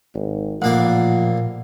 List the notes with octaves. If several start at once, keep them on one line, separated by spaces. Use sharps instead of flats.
G#1
A1 A#2 F3 A#3 D5 F#5